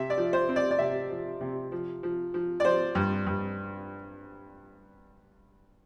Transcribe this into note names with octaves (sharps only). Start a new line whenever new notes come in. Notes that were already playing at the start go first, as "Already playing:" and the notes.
Already playing: C3 E5
D5
F3
C5
C4
D5
D5
C3 E5
F3
C3
F3
F3
F3
D5
F3 C5
G2
G2